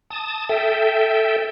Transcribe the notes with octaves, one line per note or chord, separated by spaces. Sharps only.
A5 D#6
A4 E5 G5